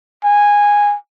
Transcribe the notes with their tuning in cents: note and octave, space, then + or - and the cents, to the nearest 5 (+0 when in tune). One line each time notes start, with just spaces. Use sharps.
G#5 -10